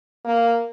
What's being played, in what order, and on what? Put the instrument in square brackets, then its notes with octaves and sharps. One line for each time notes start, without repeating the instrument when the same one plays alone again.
[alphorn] A#3